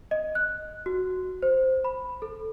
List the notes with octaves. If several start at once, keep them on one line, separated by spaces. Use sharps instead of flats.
D#5
F#6
F#4
C5
B5
A4